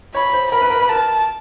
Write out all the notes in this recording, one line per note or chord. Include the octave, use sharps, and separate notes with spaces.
C#5 B5
C5
A#4 B5
B4
A#4
B4
A#4 A5